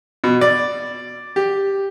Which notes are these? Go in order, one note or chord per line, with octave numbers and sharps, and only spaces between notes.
B2
D5
G4